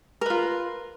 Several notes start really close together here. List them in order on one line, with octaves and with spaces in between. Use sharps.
A#4 B4 F4